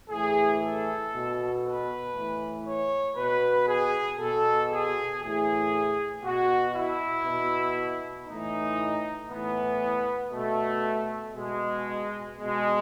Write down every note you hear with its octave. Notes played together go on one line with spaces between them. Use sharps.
A2 E3 G#4
A4
B2
B4
A2 E3
C#5
B2 B4
G#4
B2 A4
G#4
A2 E3 G#4
B2 F#4
E4
B2
A2 E3 D#4
A2 E3 B3
B2 A3
B2 G#3
B2 G#3